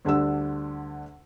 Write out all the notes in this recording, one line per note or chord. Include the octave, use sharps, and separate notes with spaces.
D2 D3 G3 D4 E6